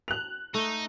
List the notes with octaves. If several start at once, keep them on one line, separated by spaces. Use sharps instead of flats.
F#6 F7
A3 D#4